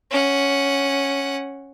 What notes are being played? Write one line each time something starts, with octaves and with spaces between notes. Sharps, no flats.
C#4 F#5